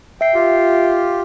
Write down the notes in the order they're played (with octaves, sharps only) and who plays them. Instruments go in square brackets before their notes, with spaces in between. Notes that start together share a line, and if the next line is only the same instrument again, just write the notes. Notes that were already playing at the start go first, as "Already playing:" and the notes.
[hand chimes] E5 C7 [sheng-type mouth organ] G5
[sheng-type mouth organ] F4 G4